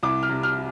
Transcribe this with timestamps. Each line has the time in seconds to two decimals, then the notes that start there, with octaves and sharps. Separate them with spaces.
0.03 C2 D6
0.23 F6
0.30 C3
0.43 F6